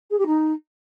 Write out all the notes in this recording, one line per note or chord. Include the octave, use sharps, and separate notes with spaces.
G#4
G4
D#4